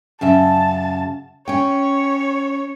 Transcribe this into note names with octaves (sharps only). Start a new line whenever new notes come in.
F#2 C#3 E5 A5
C#4 C#5 G5